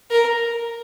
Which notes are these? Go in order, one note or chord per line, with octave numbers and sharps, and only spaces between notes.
A#4